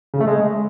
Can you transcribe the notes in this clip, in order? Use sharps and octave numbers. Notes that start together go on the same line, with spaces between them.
C#3
A3
G#3